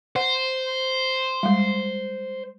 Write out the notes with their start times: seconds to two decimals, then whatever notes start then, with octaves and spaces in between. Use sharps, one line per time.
0.16 C5 F#5
1.43 G3 G#3